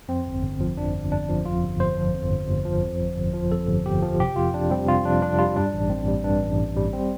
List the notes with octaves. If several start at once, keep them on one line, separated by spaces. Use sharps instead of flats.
F2 C4
G1
G1
F3
F2 D4
G1
G1 D4
F3
F2 F4
G1
G1 C5
F3
F2
G1
G1
F3
F2
G1
G1
F3
F2 A4
G1
G1 G4
F3
C3 G4
F2 F4
F2 D4
G3 C4
C3 F4
F2 D4
F2 D4
G3 F4
G2 D4
A1
A1 C4
G3
G2 D4
A1
A1
G3
C4